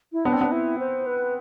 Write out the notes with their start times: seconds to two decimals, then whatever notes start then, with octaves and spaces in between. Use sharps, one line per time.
0.13 E4
0.25 B3 D4
0.32 C4
0.41 B3
0.52 E4
0.79 C5
1.06 B4